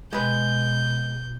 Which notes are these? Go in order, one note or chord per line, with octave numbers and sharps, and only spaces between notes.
B2 G#3 B4 G6